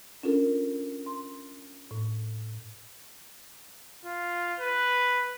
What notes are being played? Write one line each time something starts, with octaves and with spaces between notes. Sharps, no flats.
C#4 D4 F4 A4 A#4
C6
A2
F4
B4